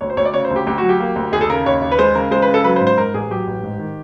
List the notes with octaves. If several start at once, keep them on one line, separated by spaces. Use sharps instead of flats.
D2 C#5
C5
D2 C#5
D5
C#3 C#5
C5
D2
G4
D2 G4
F#4
F#3
G4
A#3
D2
D#2 G#4
A4
C#3 A#4
D#2 C#5
D#2
B4
G#3 C5
C#3 A#4
G#3 C5
B4
C#3
A4
F#3 B4
C5
G#2
C5
G#2 A#4
A1 G#4
F#3 G4
A1
G#2
D#3